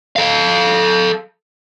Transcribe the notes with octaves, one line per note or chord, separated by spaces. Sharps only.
A4 F5